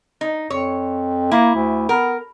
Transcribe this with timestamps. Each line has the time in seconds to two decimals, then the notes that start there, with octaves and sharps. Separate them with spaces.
0.21 D#4
0.50 F2 C#5
1.31 A#3 E4
1.54 D2
1.89 B3 A#4